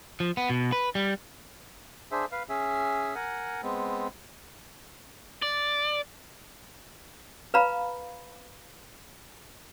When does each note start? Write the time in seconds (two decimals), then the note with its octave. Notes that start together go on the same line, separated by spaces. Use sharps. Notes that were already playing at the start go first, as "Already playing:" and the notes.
0.20 F3
0.37 B3
0.50 B2
0.72 B4
0.95 G3
2.11 D4 G#4 C5 E5
2.32 B4 F5
2.49 C#4 G#4 E5
3.15 A#4 F#5 G#5
3.63 G#3 B3 C4
5.42 D5
7.54 B4 F5 A#5 B5